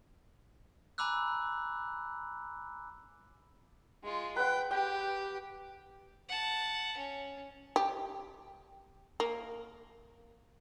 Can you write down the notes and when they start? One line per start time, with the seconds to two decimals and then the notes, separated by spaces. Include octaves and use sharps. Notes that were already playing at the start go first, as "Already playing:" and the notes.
0.98 G#5 A#5 B5 D6 E6 F#6
4.04 G#3 F4
4.36 B4 F#5 G5
4.71 G4 G5
6.29 F#5 A5
6.97 C#4
7.76 G4
9.20 A#3